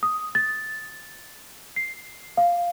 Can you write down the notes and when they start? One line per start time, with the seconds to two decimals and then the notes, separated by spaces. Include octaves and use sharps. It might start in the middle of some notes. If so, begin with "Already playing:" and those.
0.03 D#6
0.35 A6
1.76 C7
2.37 F5